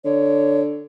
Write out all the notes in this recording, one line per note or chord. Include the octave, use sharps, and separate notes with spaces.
D3 C#5